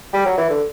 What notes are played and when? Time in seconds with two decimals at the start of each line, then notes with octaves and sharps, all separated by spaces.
0.14 G3
0.26 F#3
0.38 E3
0.50 D3